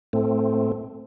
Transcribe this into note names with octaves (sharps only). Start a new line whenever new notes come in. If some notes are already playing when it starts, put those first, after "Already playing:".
A2 A3 C4